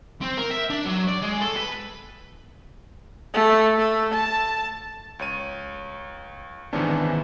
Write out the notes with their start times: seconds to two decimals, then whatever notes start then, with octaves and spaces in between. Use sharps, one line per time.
0.21 C4
0.38 A#4
0.51 E5
0.70 D4
0.85 F#3
1.08 D5
1.22 G#3
1.41 A4
1.57 B4
3.34 A3
3.78 A3
4.14 A5
5.19 C#2 C#5 D#7
6.73 G#2 C3 D#3 E3 B3 C#4 D4